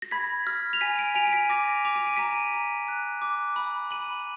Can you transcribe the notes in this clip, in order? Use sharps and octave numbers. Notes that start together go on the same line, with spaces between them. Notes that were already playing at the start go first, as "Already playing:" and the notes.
A#6
B5 G#6 B6
F6
F7
G#5 B6 D#7
D7 F7
G#5 D7 F7
D7
B6 D#7
D6 A#6 D7
D6 F7
D#7
D7
A#5 B6 D#7
A#5
F#6
D6
B5
B5 D#7 F#7